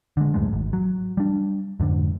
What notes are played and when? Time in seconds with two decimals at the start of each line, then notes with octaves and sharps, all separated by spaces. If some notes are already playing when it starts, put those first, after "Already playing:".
0.17 D3 G#3
0.34 D1 F#2 A2 G#3
0.53 G#1
0.73 F#3
1.17 G3 D4
1.80 F2 G#2 D3